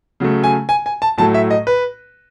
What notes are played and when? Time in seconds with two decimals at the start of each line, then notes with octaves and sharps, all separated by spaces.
0.20 C#3 F#3 A3
0.44 G#5
0.69 G#5
0.86 G#5
1.02 A5
1.18 A2 F#3 A3 A5
1.34 E5
1.51 D#5
1.67 B4